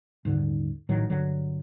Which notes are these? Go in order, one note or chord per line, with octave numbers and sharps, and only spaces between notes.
D#1 G#2 D3
A#1 A2 D#3 F#3
G2 D3 F#3